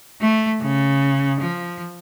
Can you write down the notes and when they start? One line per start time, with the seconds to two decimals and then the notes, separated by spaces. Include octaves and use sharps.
0.21 A3
0.61 C#3
1.40 F3